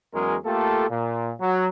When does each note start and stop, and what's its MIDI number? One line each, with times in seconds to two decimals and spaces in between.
0.14 0.37 40
0.14 0.37 54
0.14 0.37 56
0.14 0.37 61
0.14 0.37 68
0.14 0.37 70
0.45 0.86 57
0.45 0.86 58
0.45 0.86 65
0.45 0.86 67
0.45 0.86 69
0.90 1.32 46
1.40 1.68 54